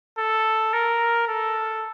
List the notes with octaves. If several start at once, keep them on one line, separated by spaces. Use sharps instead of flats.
A4
A#4
A4